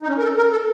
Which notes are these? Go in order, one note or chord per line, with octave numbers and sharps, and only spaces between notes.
D#4
C#4
A#4
A4
A#4
A4